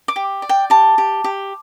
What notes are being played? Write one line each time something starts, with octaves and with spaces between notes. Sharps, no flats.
D6
G4
D5
G5
G4 A5
G4
G4